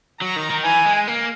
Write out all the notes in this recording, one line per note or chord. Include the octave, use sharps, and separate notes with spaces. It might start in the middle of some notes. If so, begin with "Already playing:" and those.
F#3 A#5
D#3
D#3
E3 G#5
G#3
A#3